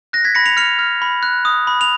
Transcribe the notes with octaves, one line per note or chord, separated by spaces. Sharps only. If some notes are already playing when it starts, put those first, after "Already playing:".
F#6 A#6
G#6 B6
B5 A#6 C#7
C#7 F7
F6 C#7 F7
F6
B5
F#6
D#6
B5
F7